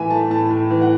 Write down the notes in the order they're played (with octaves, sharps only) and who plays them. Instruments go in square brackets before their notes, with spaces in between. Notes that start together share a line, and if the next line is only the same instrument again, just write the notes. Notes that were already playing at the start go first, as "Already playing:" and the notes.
Already playing: [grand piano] A2 E3 E5 G#5
A3 A5
A2 A5
A2
E3
F#5